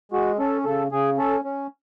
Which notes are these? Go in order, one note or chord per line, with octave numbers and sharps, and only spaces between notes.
G#3 F#4
C#4 A4
C#3 A4
C#3 G#4
C#4 A4
C#4